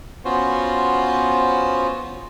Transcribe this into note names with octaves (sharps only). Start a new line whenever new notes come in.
B3 C#4 F4 F#4 C5